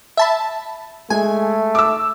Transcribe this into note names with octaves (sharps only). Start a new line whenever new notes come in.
E5 A5 B5
G#3 A3 G#5
D6 E6